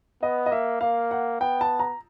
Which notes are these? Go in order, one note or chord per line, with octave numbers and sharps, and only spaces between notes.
B3 D#5
D#5
A#3 E5
A#3 F5
F#5
B3 G5
A5
A#5